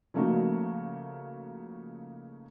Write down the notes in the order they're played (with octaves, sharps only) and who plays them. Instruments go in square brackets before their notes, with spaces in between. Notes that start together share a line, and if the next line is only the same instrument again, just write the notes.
[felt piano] C#3 F3 A3 A#3 D#4 F#4